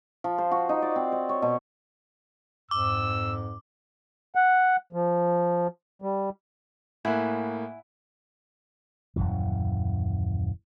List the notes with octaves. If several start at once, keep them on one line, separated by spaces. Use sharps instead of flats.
F3
C5
F#4
D#4
D5
C4
C5
C#5
B2
F2 G#2 D6 E6
F#5
F3
G3
A2 A#3 E4 F#5 G#5
D#1 B1 F#2 E3